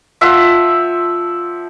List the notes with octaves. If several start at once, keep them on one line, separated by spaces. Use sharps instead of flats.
F3 E5 F#5 E6